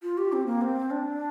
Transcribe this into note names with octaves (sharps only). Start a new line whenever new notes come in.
F4
G4
C4
A#3
C4
D4